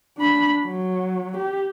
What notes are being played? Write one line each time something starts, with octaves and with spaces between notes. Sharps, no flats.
D4 B5
F#3
G4